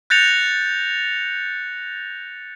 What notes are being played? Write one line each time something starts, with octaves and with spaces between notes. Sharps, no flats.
F#6 G6 A6 A#6 C#7 F7